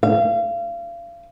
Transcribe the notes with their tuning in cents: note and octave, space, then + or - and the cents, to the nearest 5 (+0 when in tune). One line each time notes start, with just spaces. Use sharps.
F5 -30